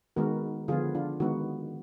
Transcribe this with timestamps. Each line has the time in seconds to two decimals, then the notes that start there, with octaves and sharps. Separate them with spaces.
0.16 D#3 G#3 B3 F#4 A#4
0.68 D3 F3 B3 F4 G#4
0.95 D4 F4
1.20 D#3 G#3 B3 D#4 F#4